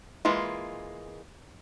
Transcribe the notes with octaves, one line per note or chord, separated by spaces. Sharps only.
E3 G#3 A#3 F4